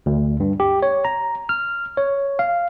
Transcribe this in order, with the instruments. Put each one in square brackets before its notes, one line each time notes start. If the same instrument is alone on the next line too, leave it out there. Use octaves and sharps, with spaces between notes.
[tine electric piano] D2
G2
G4
C#5
A#5
F6
C#5
F5